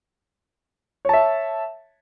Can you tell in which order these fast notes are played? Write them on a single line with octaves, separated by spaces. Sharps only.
C#5 A5 E5